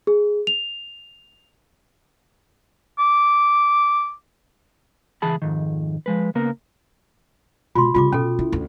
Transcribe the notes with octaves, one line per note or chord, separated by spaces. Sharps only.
G#4
F7
D6
C#2 E3 G#4 A5 B5
F2 G#2 D#3
F3 G#3 B4
C#3 A#3 B3 A#4
B2 G#3 F4 C6
C#3 G3 F4 D6
B2 C#4 A4
E4
D2